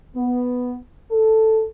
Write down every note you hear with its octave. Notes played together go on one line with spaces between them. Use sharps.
B3
A4